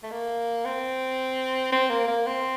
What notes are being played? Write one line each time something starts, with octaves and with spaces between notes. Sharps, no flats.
A3
A#3
C4
C4
A#3
A#3
C4